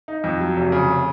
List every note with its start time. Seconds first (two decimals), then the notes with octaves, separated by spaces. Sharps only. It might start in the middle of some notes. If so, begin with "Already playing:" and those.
0.08 D#4
0.24 F2
0.40 F#3
0.57 F1
0.72 C#3